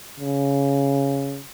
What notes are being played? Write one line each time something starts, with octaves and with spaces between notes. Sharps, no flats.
C#3